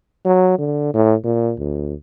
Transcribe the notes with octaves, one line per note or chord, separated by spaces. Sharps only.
F#3
D3
A2
A#2
D2